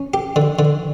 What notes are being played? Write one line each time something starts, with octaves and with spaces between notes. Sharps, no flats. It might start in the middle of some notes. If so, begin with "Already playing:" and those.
Already playing: C#4
G4
D3
D3